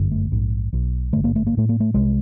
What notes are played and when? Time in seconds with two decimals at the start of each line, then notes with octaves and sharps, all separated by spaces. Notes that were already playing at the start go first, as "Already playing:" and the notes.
Already playing: G1 F#2 D3
0.11 A3
0.32 A#1 G#2
0.73 B1 B2
1.13 G#1 G2 D3 A3
1.24 A#3
1.36 A3
1.47 A#3
1.53 A1
1.57 A2 A3
1.69 A#3
1.80 A3
1.94 C2 C3 G#3